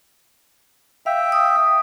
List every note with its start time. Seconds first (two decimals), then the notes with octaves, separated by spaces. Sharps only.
1.06 E5 F5 G5
1.32 D#6